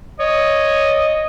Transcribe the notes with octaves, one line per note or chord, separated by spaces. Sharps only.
C#5 D#5